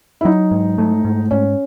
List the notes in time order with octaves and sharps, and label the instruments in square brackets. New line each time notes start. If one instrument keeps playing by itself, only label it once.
[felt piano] E4
[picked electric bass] F#3 [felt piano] D#4
[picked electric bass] G#2
A3
G#2
[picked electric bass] G#2 [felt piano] C#4